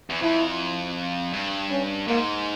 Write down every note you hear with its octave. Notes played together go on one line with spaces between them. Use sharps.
E2
F2 E4
G2
C#4
G#2 A#3